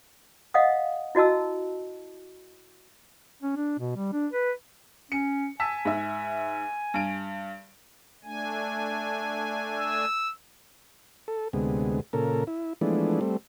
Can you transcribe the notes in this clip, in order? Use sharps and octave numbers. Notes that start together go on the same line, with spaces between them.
D#5 F5 F#5 D#6
E4 F#4 D#5 A5 E6
C#4
D4
B2
G3
D4
B4
C#4 C#7
G#5 A5 E6 B6
G#2 E5
G2 D7
A3 D4 G#5
E6
A4
D2 C3 G#3 B3
A#2 C#3 A4 A#4
E4
E3 F3 G#3 A3 B3 D4
G3 A3 C4